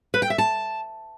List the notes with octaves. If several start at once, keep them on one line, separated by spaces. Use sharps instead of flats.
B4
G5
E5
A5